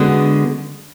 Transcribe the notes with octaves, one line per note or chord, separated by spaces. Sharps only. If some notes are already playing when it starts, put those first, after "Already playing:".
Already playing: D3 G#3 B3 D4 F#4